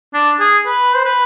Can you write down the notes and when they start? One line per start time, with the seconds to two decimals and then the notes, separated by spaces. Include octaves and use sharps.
0.14 D4
0.40 G#4
0.66 B4
0.95 C5
1.05 B4